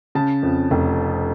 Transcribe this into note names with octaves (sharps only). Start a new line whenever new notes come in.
C#3 A5
F2
F1